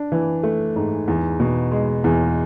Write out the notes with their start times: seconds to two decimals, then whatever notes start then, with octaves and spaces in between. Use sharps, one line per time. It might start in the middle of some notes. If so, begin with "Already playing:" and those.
Already playing: D4
0.12 E3
0.43 A3
0.76 G#2
1.08 E2
1.40 B2
1.71 G#3
2.04 E2